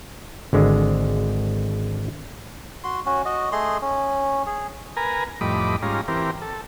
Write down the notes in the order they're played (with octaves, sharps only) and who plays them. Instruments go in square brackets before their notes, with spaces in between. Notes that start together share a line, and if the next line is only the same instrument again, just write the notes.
[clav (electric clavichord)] G#1 D3 G#3
[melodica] F#4 C6
C#4 F#4
F#4 D#5
A3 G#4 D#5 C6
C#4
G#4
[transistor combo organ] A#4 B4 G#5 A#5
F2 A2 G3 D#5 B5 D6
G#2 G3 C#4 F4 A#5
E3 C4 G4 A#4
A4